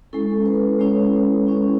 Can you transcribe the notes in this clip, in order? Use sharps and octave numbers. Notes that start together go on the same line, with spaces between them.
G#3 C#4 E4 A4
B4
G#3 C#4 E4 C#5
G#3 C#4 E4